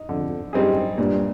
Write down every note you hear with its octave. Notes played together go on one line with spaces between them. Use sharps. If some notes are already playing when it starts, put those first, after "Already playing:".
Already playing: D#4
F2 D3
F#2 G3 C4 D#4 G#4
G2 A#2